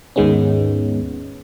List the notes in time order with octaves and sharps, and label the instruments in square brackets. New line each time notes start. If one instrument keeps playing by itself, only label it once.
[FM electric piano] D#2 G#2 D#3 G#3 B3 C#4